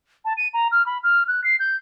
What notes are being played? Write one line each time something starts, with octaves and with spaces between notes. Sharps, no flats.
A5
D#7
A#5
F6
B5
F6
F#6
C7
G6